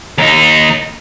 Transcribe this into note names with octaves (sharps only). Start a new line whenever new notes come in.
D#2 D#4